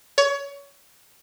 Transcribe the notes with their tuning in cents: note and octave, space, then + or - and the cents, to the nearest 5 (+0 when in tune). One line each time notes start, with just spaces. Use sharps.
C#5 +25